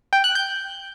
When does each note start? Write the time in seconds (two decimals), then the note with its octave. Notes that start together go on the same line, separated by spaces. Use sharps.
0.13 G5
0.24 F#6
0.35 G6